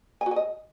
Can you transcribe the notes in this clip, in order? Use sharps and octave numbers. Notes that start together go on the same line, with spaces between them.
G#5
F#4
G#5
D#5